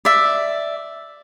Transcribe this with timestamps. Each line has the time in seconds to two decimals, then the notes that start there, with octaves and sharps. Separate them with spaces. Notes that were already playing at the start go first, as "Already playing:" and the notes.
0.05 D5 E5